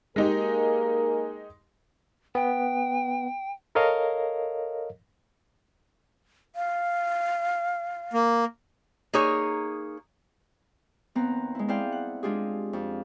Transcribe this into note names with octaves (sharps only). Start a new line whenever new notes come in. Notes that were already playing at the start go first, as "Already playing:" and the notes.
G#3 A#3 D#4 G4 G#4 A#4
B3 G5
A4 A#4 C#5 D#5 F5
F5
A#3
A#3 D#4 G#4 C#5
D#2 B3 C4 A#5
G#3 E4
C4 E4 G#4 D5 F5 G5
F#5
G#3 D4 F4 G4 G#4
F2